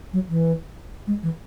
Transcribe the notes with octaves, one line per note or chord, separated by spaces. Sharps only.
F#3
E3
G#3
E3